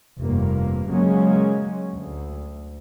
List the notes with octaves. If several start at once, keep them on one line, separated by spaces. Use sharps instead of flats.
F1 G2 A#3
C#3 F#3 G#3 A#3 C#4
D2